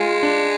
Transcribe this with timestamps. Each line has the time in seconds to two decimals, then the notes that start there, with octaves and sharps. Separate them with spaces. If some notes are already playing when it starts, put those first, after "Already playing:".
Already playing: G#3 F4
0.23 D4